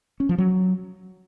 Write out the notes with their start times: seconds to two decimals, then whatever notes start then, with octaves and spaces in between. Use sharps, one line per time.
0.20 C#4
0.29 F3
0.38 F#3